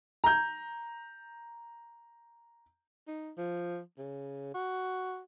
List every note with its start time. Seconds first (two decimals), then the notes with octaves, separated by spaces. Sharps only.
0.24 A#5 G6
3.08 D#4
3.37 F3
3.98 C#3
4.54 F#4